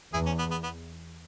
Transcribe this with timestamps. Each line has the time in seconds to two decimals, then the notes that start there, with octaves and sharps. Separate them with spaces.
0.12 E2 E4 G#4
0.26 C#4
0.39 B3
0.51 B3
0.63 B3